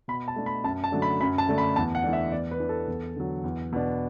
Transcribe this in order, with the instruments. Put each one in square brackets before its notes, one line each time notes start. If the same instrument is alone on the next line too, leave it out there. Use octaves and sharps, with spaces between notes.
[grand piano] B2 B5
A5
A3 D4
B5
F#2 A5
A5
D3 F#3 A3 D4
B5
F#2 B5
A5
D3 A3 D4
B5
E2 A5
F#5
E3 A3 D4
E5
E2 D5
B4
E3 D4
A4
E2
D3 F#3
E2
B2 B3 D4